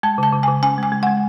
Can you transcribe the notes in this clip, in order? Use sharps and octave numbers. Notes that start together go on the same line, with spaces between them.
G#3 A5
C#3 A5
C#3
C#3 G#5
C#4 G#5
G#3
G#5
G#3
G#3 F#5